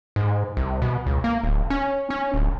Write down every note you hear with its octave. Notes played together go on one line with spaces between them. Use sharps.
G#2
C2
B2
C#2
A#3
D1
C#4
C#4
D1